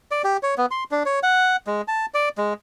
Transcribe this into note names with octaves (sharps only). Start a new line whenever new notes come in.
D5
G4
C#5
B3
C6
D4
C#5
F#5
G#3
A5
D5
G#3